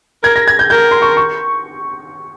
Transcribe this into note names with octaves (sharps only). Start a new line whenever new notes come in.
A#4 G#6
A#6
G#6
G6
A#4 G6
C6
C#6
C#6